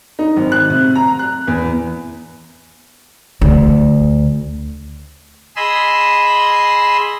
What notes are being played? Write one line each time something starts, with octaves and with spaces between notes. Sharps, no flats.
D#4
G#1
F#6
C3
A#5
F#6
E2
D2
G#4 D#5 B5 C6 E6